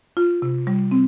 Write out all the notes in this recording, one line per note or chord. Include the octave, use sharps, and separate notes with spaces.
F4
C3
G3
C4